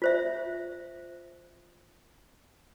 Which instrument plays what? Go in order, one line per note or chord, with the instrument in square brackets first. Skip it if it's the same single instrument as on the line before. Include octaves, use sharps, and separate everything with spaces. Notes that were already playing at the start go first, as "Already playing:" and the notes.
[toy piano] F4 C5 E5